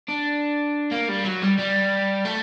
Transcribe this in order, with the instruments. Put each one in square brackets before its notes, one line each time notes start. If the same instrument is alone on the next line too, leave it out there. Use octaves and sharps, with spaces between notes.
[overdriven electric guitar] D4
A#3
G3
F#3
G3
G3
A3